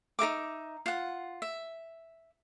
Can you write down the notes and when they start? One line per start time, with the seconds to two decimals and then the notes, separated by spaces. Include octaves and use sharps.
0.19 D#4 A#4 E5 D6
0.86 F4 F#5
1.42 E5